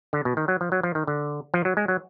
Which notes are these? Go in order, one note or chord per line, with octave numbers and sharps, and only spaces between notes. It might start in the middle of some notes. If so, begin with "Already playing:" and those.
D3
B2
D#3
F#3
F3
F#3
F3
D#3
D3
F3
F#3
G#3
F#3